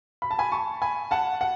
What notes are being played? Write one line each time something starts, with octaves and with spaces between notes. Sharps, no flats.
B5
A5
G#5 B5
A5 C#6
G#5 B5
F#5 A5
F#5